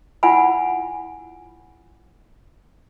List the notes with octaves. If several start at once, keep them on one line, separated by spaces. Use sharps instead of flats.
E4 F4 F#5 G#5 B5